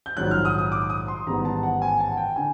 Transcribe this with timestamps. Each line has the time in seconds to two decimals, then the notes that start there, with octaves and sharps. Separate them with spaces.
0.06 G6
0.17 A#1 G#2 D#3 F#3 F#6
0.31 F6
0.45 D#6
0.58 D#6
0.72 D6
0.90 D#6
1.08 C6
1.26 A1 G#2 D#3 G3 B3 A#5
1.45 A5
1.63 F#5
1.82 G#5
2.00 A5
2.08 F#5
2.17 G5
2.36 D3 G#5